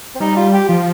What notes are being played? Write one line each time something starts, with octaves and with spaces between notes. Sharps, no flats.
C4
G3 D#4
F4
G4
F3 F4